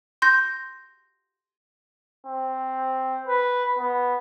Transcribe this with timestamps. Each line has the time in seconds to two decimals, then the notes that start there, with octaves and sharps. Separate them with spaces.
0.22 C6 G6 A#6
2.26 C4
3.28 B4
3.79 B3